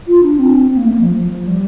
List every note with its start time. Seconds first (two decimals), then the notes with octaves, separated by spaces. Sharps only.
0.07 F4
0.23 D4
0.39 C4
0.70 C4
0.77 A#3
0.85 A3
0.92 A#3
1.01 F3
1.16 F3
1.32 F3
1.47 G3